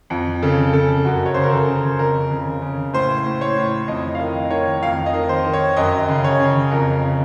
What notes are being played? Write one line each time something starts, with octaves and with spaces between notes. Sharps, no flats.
F2
C#3 A4
C#3 A4
F#2 F#4
C#5
C#3 C5
A#4
A4
C#3
F2 A#4
C#3
C#3
A2 C5
A2
C#5
A2
F2 D#5
F5
D#3 D#5
D#3 C#5
F2 F5
D#5
D#3
C5
D#3
C#5
F#2 D#5
C#3
C#5
C#3
F2 A#4
C#3